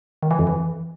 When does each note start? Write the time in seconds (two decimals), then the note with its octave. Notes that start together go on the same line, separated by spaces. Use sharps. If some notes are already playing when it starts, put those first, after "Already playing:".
0.23 D#3
0.31 E3
0.39 F2
0.47 E3